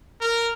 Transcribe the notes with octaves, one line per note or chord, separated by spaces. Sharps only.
A#4